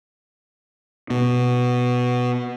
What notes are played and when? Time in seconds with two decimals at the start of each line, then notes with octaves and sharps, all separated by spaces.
1.10 B2